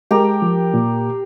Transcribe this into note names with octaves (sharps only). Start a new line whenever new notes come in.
G#3 G4 A#4
F3
A#2